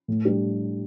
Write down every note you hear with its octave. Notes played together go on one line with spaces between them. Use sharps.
A2
G3 D4 G4